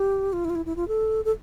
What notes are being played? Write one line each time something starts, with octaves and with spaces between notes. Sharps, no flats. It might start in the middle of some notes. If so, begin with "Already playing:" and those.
Already playing: G4
F4
E4
F4
E4
E4
F4
A4
A4